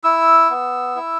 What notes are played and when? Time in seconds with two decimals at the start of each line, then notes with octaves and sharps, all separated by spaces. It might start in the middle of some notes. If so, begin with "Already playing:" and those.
0.04 E4 E6
0.50 B3
0.96 E4